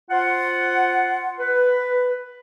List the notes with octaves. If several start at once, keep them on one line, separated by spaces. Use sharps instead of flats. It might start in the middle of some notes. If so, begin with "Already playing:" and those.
F4 C5 F#5
B4